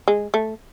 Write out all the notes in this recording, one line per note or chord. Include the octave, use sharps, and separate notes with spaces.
G#3
A3